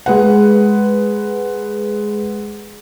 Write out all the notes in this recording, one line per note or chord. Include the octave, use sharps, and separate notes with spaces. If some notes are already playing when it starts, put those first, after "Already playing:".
G#3 B4 F#5